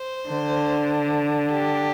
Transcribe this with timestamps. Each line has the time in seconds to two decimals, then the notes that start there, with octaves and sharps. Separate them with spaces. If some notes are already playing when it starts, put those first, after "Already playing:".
Already playing: C5
0.29 D3
1.51 G4